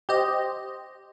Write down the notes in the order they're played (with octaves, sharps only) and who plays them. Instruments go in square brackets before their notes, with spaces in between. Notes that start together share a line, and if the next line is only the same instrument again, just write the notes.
[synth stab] G4 C5 D#5